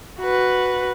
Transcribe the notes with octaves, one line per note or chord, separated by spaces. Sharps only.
F#4 B4